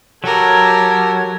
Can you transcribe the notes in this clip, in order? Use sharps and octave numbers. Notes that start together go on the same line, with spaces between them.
F#3 G4 A4 A#4 G#6